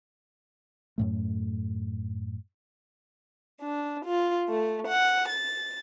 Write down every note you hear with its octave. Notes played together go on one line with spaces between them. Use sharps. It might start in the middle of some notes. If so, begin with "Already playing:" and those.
F#2 A2 A3
D4
F4
A3
F#5
A6